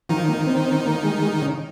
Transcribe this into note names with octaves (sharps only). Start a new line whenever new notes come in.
D#3 F3 D#4
A#3
C4
C4
A#3
G#3
G#3
C#3